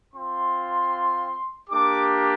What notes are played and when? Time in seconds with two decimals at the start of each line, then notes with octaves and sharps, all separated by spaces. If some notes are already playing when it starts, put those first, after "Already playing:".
0.14 C4 F4 C6
1.70 A#3 D4 G4 D6